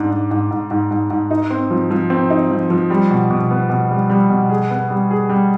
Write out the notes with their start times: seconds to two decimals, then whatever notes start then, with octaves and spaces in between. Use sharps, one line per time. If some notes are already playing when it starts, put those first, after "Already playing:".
Already playing: G#2 D4
0.11 G#2
0.31 G#2
0.51 G#2
0.71 G#2
0.91 G#2
1.10 G#2
1.31 D#4
1.50 C4
1.70 F3
1.91 F3
2.10 C4
2.30 D#4
2.50 F3
2.70 F3
2.90 G3
3.11 B2
3.31 B2
3.50 B3
3.70 B2
3.91 G3
4.10 G3
4.30 B2
4.50 G#4
4.70 B3
4.90 G3
5.11 G#4
5.29 G3